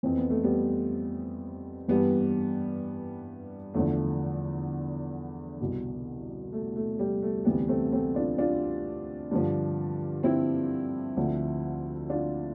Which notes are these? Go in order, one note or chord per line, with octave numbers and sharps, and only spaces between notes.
F2 E3 C4
B3
A3
G3 B3
G2 E3 G3 B3
E2 D3 F3 A3
C2 B2
A3
A3
G3
A3
D2 C3 E3 G3 B3
A3 C4
A3 C4
D4 F4
D4 F4
G2 D3 F3
C4 E4
D2 D3 F3
D4 F4